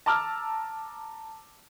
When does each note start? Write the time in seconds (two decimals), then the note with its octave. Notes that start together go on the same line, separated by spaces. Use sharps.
0.06 A5 A#5 D6 E6 F6